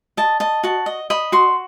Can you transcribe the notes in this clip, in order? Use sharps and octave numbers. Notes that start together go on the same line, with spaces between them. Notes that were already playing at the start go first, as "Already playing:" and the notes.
D#5 A5
D#5 A5
F#4 A5
D#5
D#5 B5
F#4 C6